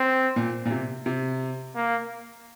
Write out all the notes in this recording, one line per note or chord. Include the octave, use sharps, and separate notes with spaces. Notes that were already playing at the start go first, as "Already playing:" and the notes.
Already playing: C4
A#2
A#2
C3
C3
A#3